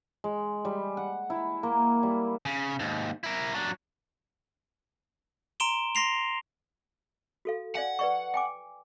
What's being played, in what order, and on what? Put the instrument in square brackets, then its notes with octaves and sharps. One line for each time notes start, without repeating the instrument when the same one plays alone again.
[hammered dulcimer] G#3
G3
F#5
E4
A#3
G3
[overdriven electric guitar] C#3
D#2 G#2
E4 A#4
F#3 D4
[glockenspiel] A#5 C6 D7 E7 G7
C6 A#6 C7 F7
[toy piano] F#4 A4 F5
[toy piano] D5 F5 G#5 [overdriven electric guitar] F#5
[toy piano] B4 D5 C#6
G5 G#5 D6